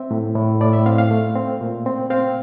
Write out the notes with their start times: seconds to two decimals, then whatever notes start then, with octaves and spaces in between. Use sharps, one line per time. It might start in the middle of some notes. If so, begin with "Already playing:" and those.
Already playing: C4 E5
0.11 A2
0.36 A2
0.60 A2 D5
0.73 E5
0.86 C4 F5
0.98 F5
1.11 A3
1.36 C4
1.61 A#2
1.86 C4
2.10 C4 F5